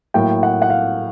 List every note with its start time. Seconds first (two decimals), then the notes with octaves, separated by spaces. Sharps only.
0.14 A2 F#3 A#3 G5
0.43 F#5
0.62 F#5
0.70 F5